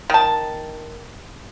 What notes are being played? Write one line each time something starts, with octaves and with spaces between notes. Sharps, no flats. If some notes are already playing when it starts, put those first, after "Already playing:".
D#3 A5